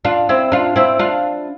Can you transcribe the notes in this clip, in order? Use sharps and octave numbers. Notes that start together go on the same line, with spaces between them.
D4 F4
C4 E4
D4 F4
C4 E4
D4 F4